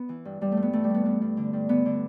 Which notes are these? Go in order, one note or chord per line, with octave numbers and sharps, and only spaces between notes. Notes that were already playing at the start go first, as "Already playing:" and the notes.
Already playing: B3
E3
G2
G2 G3
A3
G2
B3
E3 A3
G3
G2 B3
G2 B3
G2
D3
G2
D3 B3
D3